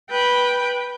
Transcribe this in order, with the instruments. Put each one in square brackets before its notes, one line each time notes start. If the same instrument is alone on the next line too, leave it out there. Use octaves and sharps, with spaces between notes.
[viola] B4 G5